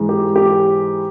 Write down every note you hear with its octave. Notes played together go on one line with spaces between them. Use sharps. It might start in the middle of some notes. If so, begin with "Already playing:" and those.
Already playing: G#2 E3 G#3
G4
G4